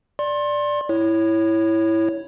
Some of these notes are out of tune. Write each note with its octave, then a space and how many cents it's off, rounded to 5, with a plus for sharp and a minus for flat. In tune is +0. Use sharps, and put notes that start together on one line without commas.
D5 +0 C6 +30
E4 +0 C#5 +0